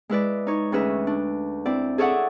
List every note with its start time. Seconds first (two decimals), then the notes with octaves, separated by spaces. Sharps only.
0.09 G#3 E4 B4 D5
0.47 D#4 C#5
0.72 D2 E3 C#4 G#4 B4 E5
1.07 D4
1.66 C4 E4 D5
1.98 G#4 A4 C#5 D5 E5 F#5